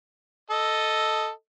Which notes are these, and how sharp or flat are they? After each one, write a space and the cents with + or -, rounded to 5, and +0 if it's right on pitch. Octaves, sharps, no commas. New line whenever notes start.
A4 +0 D#5 +0